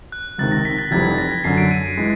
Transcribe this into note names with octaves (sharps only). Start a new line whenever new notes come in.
F#6
C#2 C3 D#3 A6
A#6
B6
A6
F1 F2 C3 E3 G3 G#6
A6
A#6
B6
F#2 D3 F#3 C7
D7
D#7
E3 G#3